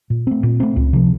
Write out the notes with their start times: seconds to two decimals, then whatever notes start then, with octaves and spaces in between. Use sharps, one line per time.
0.10 A#2
0.27 A3 C4
0.43 A#2
0.60 A3 C4
0.76 C#2
0.93 C3 F3